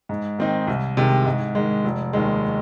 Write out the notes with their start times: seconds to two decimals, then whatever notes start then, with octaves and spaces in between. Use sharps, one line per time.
0.09 G#2
0.39 D#3 C4 D#4
0.67 C2
0.97 C3 D#3 G#3
1.26 G#2
1.55 D#3 G#3
1.84 F1
2.13 D#2 D#3 G#3